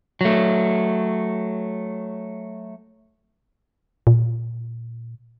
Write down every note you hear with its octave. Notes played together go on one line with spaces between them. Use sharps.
F#3 A3
A#2